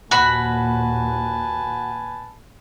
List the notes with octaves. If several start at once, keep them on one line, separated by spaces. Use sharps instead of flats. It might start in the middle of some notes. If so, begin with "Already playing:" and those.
D#2 A#2 F#4 B4 G#5 A5 B5